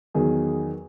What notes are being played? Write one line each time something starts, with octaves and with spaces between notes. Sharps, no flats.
E2 D#3 F#3 G#4